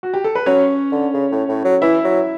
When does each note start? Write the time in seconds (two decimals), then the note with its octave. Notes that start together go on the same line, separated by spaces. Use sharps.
0.03 F#4
0.14 G4
0.24 A4
0.35 B4
0.46 F#3 C#4 C#5
0.92 D3
1.14 C#3
1.31 A2
1.48 A2
1.64 F#3
1.82 E3 E4 E5
2.04 F#3